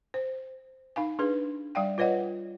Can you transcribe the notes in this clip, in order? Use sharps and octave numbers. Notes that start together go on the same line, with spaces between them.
C5
D#4 F5 G#5
D4 G#4 B4
G3 D5 F5 G5
F4 B4 C#5 D#5 F#5